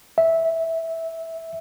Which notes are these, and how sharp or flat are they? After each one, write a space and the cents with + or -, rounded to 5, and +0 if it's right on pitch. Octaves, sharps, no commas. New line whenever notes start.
E5 -10